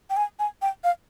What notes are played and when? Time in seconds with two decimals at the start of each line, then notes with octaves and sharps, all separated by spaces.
0.10 G5
0.17 G#5
0.39 G#5
0.62 G5
0.84 F5